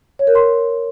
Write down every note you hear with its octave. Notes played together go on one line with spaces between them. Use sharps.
C#5
A#4
C6